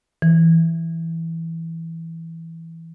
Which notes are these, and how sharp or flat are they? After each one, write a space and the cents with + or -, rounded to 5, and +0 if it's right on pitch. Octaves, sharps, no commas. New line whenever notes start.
E3 -5